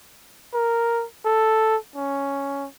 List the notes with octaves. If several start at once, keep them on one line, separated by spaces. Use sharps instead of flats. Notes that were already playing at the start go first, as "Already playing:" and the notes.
A#4
A4
C#4